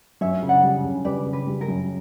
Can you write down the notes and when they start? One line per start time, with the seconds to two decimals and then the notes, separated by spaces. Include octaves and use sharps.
0.21 F#2 C#5 E5
0.42 C#3
0.49 D5 F#5
0.63 G3
0.84 C#3
1.05 G3 B4 D5
1.26 C#3
1.33 B4
1.47 G3
1.61 A#4
1.68 F#2